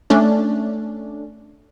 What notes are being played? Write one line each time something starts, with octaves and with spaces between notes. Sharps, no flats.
A3 C#4 D4